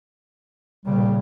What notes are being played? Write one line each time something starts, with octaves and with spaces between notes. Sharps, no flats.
A#2 C#3 G3